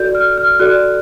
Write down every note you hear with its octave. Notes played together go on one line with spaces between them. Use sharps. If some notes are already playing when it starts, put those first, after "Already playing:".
Already playing: F#4 A4 D5 G6
F6
F6
F#4 A4 D5 F#6